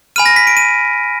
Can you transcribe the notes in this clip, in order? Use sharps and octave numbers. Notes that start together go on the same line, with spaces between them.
G#5 B5 F6 D#7
A#6
B6
D7
D#7